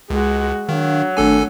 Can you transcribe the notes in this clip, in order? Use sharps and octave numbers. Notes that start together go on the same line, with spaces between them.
C#2 G#3 F#4
D#3 F#3 D4 F5
G#1 A3 D4 A4 G#5